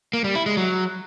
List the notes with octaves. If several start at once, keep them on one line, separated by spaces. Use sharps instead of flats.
A#3
G3
E4
G#3
F#3